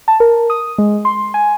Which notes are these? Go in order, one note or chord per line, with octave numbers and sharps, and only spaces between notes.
A5
A#4
D#6
G#3
C6
G#5